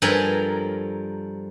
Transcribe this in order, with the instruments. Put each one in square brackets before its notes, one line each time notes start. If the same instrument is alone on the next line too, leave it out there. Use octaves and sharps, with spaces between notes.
[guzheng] G2 F3 A4 A#4 G#5 B5